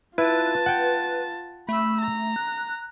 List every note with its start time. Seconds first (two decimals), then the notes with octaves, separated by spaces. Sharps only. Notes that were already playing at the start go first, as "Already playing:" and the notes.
0.18 E4 F4 B4 A5
0.66 F#5 G5
1.69 A3 B5 E6
2.01 A#5
2.36 F#6